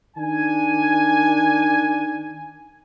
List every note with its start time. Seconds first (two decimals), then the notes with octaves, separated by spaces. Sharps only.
0.17 D#3 D4 G#5